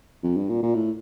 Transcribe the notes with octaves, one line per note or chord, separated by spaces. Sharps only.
F2
G2
A#2
A#2
A2